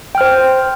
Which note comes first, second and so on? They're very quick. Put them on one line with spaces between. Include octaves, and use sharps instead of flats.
G5 F6 C5